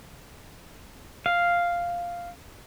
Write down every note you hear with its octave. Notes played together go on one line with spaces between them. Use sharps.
F5